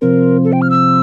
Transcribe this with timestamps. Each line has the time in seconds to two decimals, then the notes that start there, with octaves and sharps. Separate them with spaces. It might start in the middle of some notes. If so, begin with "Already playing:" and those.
0.01 C3 F3 C4 A#4
0.44 A4
0.53 G5
0.62 F6
0.70 E6